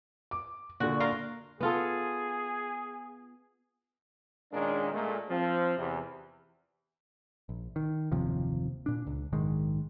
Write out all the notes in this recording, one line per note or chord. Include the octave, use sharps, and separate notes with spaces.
D6
A#2 D3 F#4
F4 A#4 F5
B3 F4 G#4 A4
A#2 D#3 G#3 A#3 C#4 D4
A#2 G#3 A3
F3 C4
E2 C3 E3
A#1
D#3
F#1 D#2 C3 F3
A#2 D4
C#2
A#1 G#2 D#3 G#3